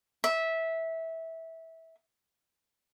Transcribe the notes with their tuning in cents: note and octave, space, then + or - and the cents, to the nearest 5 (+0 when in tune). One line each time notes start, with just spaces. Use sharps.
E5 -15